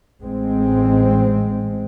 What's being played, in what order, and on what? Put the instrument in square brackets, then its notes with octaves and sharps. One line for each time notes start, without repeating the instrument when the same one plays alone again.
[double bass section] A1 G#3 C4